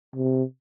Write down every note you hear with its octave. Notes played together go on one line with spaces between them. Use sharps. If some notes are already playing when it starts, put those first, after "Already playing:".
C3